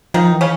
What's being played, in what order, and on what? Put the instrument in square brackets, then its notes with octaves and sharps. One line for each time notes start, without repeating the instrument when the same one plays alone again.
[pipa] D#3 D#4 [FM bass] F3
[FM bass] E3
[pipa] C#3 C#4